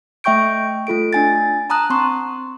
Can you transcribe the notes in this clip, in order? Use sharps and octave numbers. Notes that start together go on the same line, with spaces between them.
A3 E5 G5 C#6 G6 D7
A3 F4 A4 D7
D4 G#5 A6
A5 A#5 D#6 F#6
C4 C6 C#6